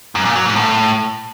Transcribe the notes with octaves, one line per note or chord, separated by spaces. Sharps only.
F#2
A#2
F#3
G#2
A2